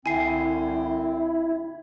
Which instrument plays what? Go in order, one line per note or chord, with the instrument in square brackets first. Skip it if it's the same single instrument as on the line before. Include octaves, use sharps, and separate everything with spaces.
[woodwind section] C2 D3 C4 [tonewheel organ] E4 [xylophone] G#5 C7